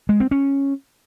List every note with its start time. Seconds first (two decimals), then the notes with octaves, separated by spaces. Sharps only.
0.09 G#3
0.20 C4
0.31 C#4